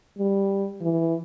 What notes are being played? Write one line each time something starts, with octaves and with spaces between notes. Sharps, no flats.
G3
E3